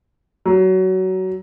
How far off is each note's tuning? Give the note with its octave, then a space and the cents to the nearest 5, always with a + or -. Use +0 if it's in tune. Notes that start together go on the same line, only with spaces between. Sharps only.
F#3 +20